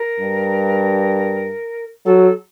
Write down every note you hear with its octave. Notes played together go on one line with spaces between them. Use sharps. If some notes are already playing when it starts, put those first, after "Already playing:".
Already playing: A#4
G2
F#3 A4